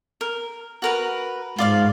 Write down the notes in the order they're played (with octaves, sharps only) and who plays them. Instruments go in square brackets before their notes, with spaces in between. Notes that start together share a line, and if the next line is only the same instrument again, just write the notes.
[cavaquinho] A#4
F#4 A#4 B4
[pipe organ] G#2 [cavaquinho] F4 D5 F5